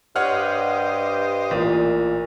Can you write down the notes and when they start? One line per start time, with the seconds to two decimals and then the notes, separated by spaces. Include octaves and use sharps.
0.16 G2 G4 C5 C#5 D#5 F#5 F6
1.51 A1 A#2